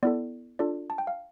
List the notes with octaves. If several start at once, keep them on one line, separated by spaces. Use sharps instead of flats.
B3 E4 A4 D5
D4 F4 A4 D5
A5
G5
F5